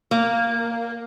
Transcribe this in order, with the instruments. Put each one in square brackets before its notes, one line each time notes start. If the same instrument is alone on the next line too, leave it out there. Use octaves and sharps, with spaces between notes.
[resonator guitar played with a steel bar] A#3